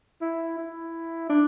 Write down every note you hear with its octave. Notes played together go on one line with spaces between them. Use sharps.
E4
E4
D4